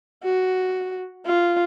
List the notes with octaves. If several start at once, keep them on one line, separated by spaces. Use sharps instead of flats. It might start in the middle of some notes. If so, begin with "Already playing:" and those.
F#4
F4